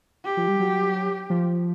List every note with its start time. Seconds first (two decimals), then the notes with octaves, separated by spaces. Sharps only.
0.25 G4
0.37 F3
0.48 G3
0.60 F#3
1.30 F3